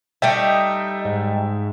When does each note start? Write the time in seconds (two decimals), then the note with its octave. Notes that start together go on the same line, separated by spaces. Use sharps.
0.22 G3 A3 D#4 D#5 E5 G5
1.05 G#2